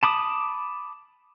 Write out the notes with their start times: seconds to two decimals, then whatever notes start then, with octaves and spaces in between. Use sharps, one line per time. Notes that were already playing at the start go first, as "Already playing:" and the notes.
0.03 A5 B5 D6 D#6